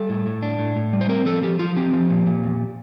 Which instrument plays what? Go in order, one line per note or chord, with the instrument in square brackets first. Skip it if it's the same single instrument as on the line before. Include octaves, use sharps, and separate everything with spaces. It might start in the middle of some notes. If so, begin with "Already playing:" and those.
Already playing: [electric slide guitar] G3 A4
A2
A2
D4
A2
A2
G3
C5
C4 A#4
F3 A4
F3 G4
F3 F4
C4 G4
F3
A#2
A#2
E2